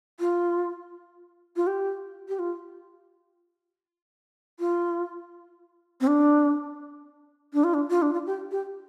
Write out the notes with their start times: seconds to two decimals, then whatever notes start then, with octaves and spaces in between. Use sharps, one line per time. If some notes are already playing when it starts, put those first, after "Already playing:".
0.20 F4
1.56 F4
1.67 G4
2.29 G4
2.39 F4
4.60 F4
6.01 C4
6.07 D4
7.53 D4
7.64 F4
7.74 D4
7.90 F4
8.02 D4
8.13 F4
8.27 G4
8.51 G4